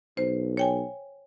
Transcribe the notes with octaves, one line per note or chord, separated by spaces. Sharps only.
B1 C5
C#5 G5 G#5